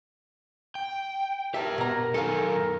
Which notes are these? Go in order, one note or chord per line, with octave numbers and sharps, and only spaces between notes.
G5
G4 A#4 E5 A5
B2 A#4 A#5
F#2 D#3 A4 A#4 F5 G#5